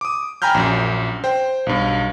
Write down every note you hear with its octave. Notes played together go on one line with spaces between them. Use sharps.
D6 D#6
G5 G#5 A#5 B5 F6 G6
A#1 F#2
C5 G5
B1 G2